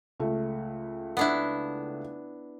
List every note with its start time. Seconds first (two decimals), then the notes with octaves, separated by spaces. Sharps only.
0.20 C#2 A3
1.17 B3 D4 E4